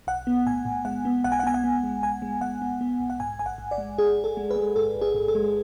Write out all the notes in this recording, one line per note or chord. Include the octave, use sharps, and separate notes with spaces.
B1 F#5
B3
A2 G#5
A2
G#3 F#5
B3
B1 F#5
G#5
F#5
B3 G#5
F#5
B3
G#3
B1 G#5
G#3
G#3 F#5
B3
B3
B1
F#5
G#2 G#5
A1 G#5
F#5
G#2
D5
G#3
A1 G#4
A1
A4
G#3
B4
G#3
G#2 A4
A1
G#4
G#2
A4
G#3